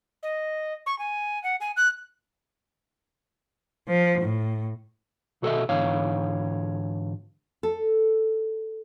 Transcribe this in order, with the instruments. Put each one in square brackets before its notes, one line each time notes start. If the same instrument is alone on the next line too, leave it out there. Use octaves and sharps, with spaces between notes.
[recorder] D#5
C#6
G#5
F#5
G#5
F#6
[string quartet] F3
A2
[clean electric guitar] B1 F#4 A4 A#4 D#5 E5
G#2 D3 E3 C#5 F5
[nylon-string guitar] A4